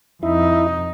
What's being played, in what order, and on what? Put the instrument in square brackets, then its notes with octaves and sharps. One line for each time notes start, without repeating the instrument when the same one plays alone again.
[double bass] F2 D#4 [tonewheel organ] E4